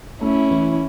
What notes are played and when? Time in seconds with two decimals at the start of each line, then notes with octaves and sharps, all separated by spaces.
0.21 A3 C#4 E4
0.51 E3